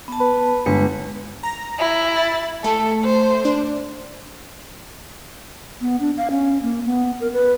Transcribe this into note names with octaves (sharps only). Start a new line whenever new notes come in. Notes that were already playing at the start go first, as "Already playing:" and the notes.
B3 A5
B4
G1 G#3 B4
A#5
E4
A6
A3 A4
C5
D4
B3
D4
F5
C#4
A#3
B3
A#4
B4